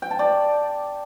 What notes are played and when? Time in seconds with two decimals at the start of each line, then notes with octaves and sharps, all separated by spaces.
0.02 G5
0.11 A5
0.19 D5